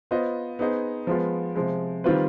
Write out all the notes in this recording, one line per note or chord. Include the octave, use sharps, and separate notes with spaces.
B3 F4 C5 D#5
B3 D#4 G#4 C5 D#5
F3 G#3 B3 F4
C3 F3 G#3
D#3 G3 C4 F4 B4